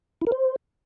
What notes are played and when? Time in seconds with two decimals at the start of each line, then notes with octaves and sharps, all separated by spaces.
0.21 E4
0.27 A#4
0.32 C5